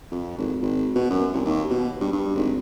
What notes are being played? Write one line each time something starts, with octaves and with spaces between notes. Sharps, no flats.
F2
G#1
G#1
B2
F#2
C2
D#2
B2
G2
G2
G#1